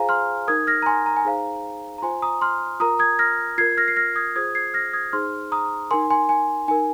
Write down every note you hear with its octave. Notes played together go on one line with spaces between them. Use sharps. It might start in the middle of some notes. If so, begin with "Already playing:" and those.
Already playing: F4 G#4 C5 F5 G#5 A#5
C6 F6
D#4 A#4 D#6 G#6
F6 A#6
A#5
G#5 C6
A#5
G#5
D#4 G#4 C5 F5 A#5
A#5
F4 C5 G#5 C6
A#5 D#6
C6 F6
F4 A#4 A#5 D#6
D#6 G#6
F6 A#6
F4 A#4 G#6 C7
F6 A#6
C7
F6 A#6
D#6 G#6
F4 G#4 C5 D#6 G#6
G#6 C7
F6 A#6
D#6 G#6
D#4 G#4 C5 C6 F6
A#5 D#6
D#4 A#4 G#5 C6
G#5 C6
G#5
D#4 A#4 G#5